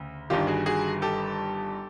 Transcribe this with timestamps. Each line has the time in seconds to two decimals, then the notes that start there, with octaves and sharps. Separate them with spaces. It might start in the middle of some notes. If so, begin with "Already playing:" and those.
Already playing: D2 C#3
0.30 G1 G2 D#3 G3 F4 G4
0.47 F#4 G#4
0.66 F#4 G#4
1.02 G4 A4